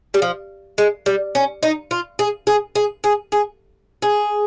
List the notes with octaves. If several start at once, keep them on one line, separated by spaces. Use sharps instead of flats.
G3
F3
G#3
G3
C#4
D#4
F4
G#4
G#4
G#4
G#4
G#4
G#4